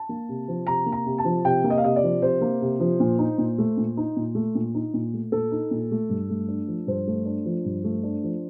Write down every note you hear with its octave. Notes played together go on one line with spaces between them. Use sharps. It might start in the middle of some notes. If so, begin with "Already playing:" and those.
Already playing: A5
A#3
C3
F3
C3 A#5
A#3
A#5
C3
A5
F3
C3 G5
A#3
D#5
F5
C3 D#5
D5
F3
C3 C5
A#3
C3
F3
A#2
D#4
A#2
A3
A#2
D#4
A#2
A3
A#2
D#4
A#2
A3
A#2 A4
D#4
A#2
A3
G2
A3
D4
F3
G2 C5
A3
D4
F3
G2
A3
D4
F3